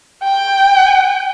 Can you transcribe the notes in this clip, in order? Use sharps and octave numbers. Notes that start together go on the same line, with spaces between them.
G5